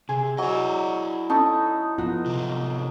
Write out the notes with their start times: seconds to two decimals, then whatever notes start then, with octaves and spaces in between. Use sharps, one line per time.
0.09 C3 G#4
0.38 F#3 E4 D5 D#5 G#5
1.30 C#4 D#4 A4 A5 D#6
1.98 F3 B3 F4 F#4
2.26 C3 F#3